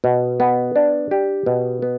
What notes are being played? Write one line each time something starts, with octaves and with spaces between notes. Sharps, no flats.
B2
B3
D4
G4
B2
B3